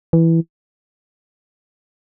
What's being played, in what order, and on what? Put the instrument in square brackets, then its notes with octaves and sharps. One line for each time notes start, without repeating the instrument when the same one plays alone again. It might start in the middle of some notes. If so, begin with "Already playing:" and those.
[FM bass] E3